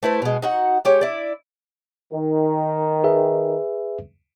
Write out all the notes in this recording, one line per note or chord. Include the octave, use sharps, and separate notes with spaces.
A3 E4 B4 C5
B2 G#3
D#4 F#4 F#5
G#3 G4 C#5
E4 D5
D#3
G#4 B4 E5